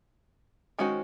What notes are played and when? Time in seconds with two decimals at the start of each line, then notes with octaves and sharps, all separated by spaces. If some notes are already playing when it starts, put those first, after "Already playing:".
0.78 D#3 G#3 C#4 F#4 C5